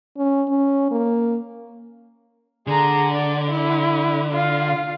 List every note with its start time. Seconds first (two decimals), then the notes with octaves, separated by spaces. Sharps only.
0.17 C#4
0.49 C#4
0.91 A#3
2.67 D3 G#4 A#5
3.12 D5
3.51 E4
4.32 F4 F5